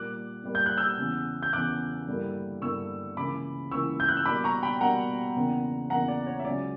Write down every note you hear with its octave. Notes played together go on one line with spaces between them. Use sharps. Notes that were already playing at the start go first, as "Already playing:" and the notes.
Already playing: A#2 G3 A#3 D6 F#6
A#2 G3 A#3
G6
F#6
E6 G6
E2 C#3 E3
G6
E2 C#3 E3 D6 F#6
G2 D3 G3 A#3 E4
G2 D3 G3 A#3 E4 C#6 E6
C#2 C#3 E3 A#3 E4 B5 D6
C#2 C#3 E3 A#3 E4 C#6 E6
G6
F#6
E6
B2 G3 A#3 D4 B5 D6
A#5 C#6
G5 B5
B2 G3 A#3 D4 F#5 A#5
E2 C#3 E3 A#3 D4
E2 C#3 E3 A#3 D4 F#5 A#5
D5
C#5
E5
C#2 C#3 F#3 C#4 D5